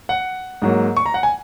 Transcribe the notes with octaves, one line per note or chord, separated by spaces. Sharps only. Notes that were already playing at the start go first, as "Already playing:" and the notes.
F#5
G#2 F#3 A#3
C#6
A#5
F#5
G#5